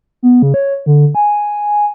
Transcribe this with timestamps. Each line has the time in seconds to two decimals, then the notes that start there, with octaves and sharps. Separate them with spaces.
0.23 B3
0.42 C#3
0.54 C#5
0.86 D3
1.15 G#5